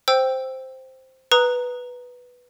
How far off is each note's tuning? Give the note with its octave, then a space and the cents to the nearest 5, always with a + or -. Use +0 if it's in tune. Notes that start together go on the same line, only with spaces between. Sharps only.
C5 +0 G5 +0 E6 +0
B4 -5 A#5 +0 D#6 +0